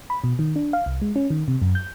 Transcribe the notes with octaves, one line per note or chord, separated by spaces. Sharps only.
B5
B2
D#3
D4
F5
C2
G#3
C#4
D#3
C3
F#2
G6